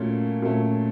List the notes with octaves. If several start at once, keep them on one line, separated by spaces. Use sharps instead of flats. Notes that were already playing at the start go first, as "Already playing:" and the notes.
Already playing: A#2 F#3 A3 C#4
A#2 F#3 A3 C#4